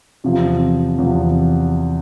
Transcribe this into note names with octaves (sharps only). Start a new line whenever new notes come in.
E2 C3 F3
E2 C3 F3